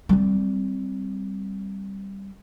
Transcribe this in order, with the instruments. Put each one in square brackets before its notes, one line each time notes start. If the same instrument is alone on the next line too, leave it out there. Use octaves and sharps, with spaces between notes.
[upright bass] G3 C4